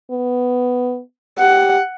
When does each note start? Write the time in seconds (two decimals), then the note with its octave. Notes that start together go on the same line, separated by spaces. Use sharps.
0.11 B3
1.39 G4 F#5